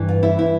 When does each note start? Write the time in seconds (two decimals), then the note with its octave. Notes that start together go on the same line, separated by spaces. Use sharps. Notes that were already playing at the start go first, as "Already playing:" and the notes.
Already playing: G2 E3
0.09 F4
0.23 E4
0.39 E4